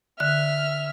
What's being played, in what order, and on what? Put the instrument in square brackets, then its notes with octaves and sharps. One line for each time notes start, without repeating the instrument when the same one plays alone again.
[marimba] D3 F#6 [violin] E5 F6